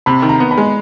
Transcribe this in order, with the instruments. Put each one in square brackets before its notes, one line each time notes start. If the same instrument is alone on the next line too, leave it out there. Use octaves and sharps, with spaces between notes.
[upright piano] C3 [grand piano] B5
[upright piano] D#3
[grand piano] A#5
[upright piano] B3
[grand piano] B5
[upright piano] G#3